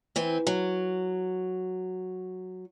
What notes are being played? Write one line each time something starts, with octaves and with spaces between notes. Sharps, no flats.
E3 C4
F#3